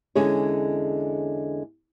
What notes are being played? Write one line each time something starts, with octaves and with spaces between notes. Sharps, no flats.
E2 D3 G#3 C#4 G#4 C#5